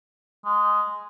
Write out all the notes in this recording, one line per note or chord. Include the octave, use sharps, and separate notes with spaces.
G#3